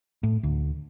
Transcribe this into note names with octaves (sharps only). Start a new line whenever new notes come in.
A2
D2